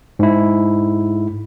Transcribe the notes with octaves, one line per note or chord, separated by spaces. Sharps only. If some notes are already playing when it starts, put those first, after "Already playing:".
G#2 E4